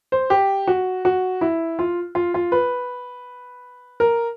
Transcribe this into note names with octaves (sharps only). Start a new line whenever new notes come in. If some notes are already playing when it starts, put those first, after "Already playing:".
C5
G4
F#4
F#4
E4
F4
F4
F4
B4
A#4